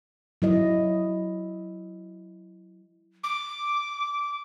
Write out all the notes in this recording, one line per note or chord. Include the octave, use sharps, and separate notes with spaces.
F#3 E4 D#5
D6